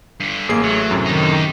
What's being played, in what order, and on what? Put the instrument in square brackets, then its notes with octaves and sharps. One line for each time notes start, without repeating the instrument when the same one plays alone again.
[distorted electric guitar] G2 D3
[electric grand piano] A1 G#4 C7 [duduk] A#3
[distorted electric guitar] F#3 [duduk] A3
[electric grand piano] F#2 A2 C3
[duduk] D#3 [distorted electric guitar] D#4 G4